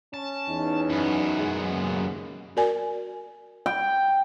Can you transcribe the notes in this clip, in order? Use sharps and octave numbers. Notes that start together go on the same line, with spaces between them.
C#4 A5
E2 D#4
F#2 B3
G#3
D#2 C#3 A#3
F#4 A#4 D5 G#5
G5